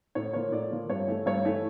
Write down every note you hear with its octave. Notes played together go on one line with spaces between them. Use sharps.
A2 C#5
F3 A#3 C#5
A2 D5
F3 A#3
G2 C#5
E3 A3
G2 C#5
E3 A3